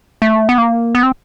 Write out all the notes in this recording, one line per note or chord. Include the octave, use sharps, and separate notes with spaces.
A3
B3
A#3
B3
C4